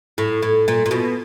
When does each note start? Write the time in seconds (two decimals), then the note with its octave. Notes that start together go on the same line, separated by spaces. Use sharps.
0.18 A2
0.42 A2
0.68 A#2
0.86 A#2
0.91 B2